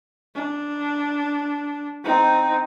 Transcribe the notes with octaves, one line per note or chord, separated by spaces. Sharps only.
D4
C4 D#4